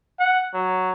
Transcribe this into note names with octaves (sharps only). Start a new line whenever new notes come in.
F#5
F#3